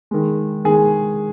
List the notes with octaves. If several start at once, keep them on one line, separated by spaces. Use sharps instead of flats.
D#3 G#3
D#3 G#3 G#4